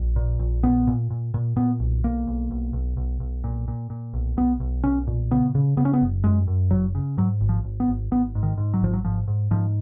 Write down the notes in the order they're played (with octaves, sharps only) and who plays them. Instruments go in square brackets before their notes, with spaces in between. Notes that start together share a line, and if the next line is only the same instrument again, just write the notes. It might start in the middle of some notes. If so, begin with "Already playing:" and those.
Already playing: [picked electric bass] A#1
A#2
A#1
A#2 B3
A#2
A#2
A#2
A#2 B3
B1
B1 A#3
B1
B1
B1
B1
B1
A#2
A#2
A#2
B1
B1 B3
B1
B1 C#4
A#2
C#3 B3
C#3
C#3 B3
C#4
B3
F#1
F#2 G#3
F#2
F#1 F#3
C#3
G#2 F#3
G#1
F3
G#1
B3
G#1
G#1 B3
G#2
D#3
G#2
F#3
G#1 F3
F#3
G#2 F3
G#2
G#2 F3